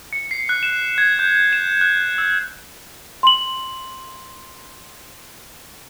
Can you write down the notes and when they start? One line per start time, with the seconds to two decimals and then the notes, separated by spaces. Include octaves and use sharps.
0.13 C#7
0.31 C7
0.49 F#6
0.63 E7
0.98 G#6
1.19 G6
1.36 E7
1.53 E7
1.81 F#6
2.18 E6
3.23 C6 F#7